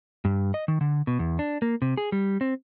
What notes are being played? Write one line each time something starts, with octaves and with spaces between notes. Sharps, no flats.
G2
D#5
D#3
D3
B2
E2
D4
A#3
C3
G#4
G3
C4